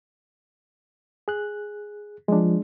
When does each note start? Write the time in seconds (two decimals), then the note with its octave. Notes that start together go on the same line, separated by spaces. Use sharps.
1.28 G#4 F#6
2.28 F3 G#3 D4